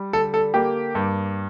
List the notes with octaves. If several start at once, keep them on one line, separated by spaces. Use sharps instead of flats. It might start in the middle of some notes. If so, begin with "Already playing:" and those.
Already playing: G3
D3 A4
A4
A#3 G4
G2